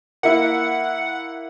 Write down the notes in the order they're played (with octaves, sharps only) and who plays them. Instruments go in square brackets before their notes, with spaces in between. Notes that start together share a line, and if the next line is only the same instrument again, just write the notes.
[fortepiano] A#3 E4 [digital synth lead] F#5